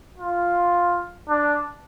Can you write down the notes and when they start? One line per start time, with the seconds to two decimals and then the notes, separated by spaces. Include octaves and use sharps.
0.18 F4
1.29 D4